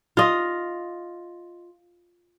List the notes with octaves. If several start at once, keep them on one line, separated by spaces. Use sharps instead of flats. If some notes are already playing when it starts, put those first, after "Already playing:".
F4 D#5